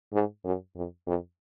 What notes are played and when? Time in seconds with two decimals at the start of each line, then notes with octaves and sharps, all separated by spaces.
0.13 G#2
0.45 F#2
0.76 F2
1.07 F2